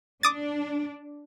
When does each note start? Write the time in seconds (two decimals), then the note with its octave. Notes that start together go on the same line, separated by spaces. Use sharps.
0.23 D4 D6 D#6 A6